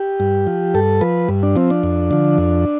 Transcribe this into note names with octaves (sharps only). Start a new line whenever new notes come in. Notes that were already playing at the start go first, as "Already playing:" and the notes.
Already playing: G4
G2
F3
G2 A4
F3 B4
G2
D4
F3 C4
D4
F2
D3 F3
F2